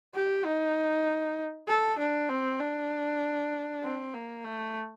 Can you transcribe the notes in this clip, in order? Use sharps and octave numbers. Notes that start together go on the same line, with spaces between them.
G4
D#4
A4
D4
C4
D4
C4
A#3
A3